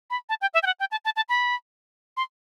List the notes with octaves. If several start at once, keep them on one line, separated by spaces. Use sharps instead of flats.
B5
A5
G5
E5
G5
F#5
G5
A5
A5
A5
B5
C6